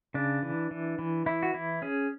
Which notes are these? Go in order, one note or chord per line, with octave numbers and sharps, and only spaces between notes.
C#3 D4
E3
E3
E3
E3 E4
F#4
E3 E4
C#4 G#4